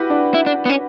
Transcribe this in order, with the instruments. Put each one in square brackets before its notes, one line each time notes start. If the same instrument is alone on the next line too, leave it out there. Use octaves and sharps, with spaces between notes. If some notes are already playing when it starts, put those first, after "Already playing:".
Already playing: [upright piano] E4 F#4 G4 B4
D4
[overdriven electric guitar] E4
D4
B3
C#4